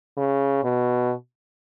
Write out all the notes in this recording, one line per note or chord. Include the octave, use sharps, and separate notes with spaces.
C#3
B2